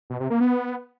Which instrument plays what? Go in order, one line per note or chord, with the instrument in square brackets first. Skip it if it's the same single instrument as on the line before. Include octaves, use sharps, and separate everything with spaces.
[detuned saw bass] B2
C3
A#3
B3